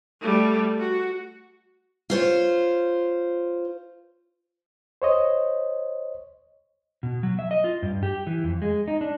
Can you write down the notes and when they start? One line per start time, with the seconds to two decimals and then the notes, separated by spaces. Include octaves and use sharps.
0.21 G3 A3
0.79 F#4
2.10 F4 C5 C#5
5.02 C5 C#5 D#5
7.03 B2
7.23 F#3
7.39 E5
7.51 D#5
7.64 F4
7.82 G2
8.03 G4
8.27 E3
8.44 F2
8.62 G#3
8.88 D#4
9.01 D4